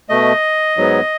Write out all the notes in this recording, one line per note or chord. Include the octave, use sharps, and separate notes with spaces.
B2 A3 D#5
G#2 F#3 B3